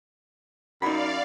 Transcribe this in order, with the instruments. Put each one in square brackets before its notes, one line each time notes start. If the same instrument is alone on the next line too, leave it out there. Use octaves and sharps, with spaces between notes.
[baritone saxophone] F#2 [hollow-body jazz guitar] D#4 B5 [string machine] D5 F5